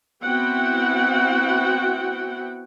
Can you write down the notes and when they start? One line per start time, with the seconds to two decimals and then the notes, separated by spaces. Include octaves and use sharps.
0.24 B3 C4 E4 F#4 F#5 G5